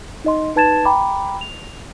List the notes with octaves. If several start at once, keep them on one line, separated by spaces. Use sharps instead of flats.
D#4 D#5 C6
D#4 B4 A5 G#6 A6 E7
G5 A#5 B5 D6
F7